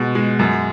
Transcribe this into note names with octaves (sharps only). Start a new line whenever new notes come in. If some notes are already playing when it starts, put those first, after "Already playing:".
Already playing: B2 G#3
G#3
F#2